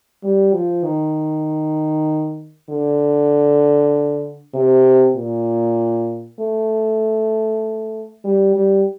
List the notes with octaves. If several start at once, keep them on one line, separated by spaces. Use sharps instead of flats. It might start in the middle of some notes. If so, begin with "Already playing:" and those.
G3
F3
D#3
D3
C3
A#2
A3
G3
G3